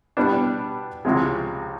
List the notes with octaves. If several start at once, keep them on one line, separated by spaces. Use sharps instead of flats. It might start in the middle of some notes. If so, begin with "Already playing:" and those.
B2 G3 B3 D4
C#2 C3 F3 G#3 C4